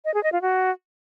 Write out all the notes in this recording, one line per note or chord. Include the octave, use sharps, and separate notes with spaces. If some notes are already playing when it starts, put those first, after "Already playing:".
D#5
G#4
D#5
F4
F#4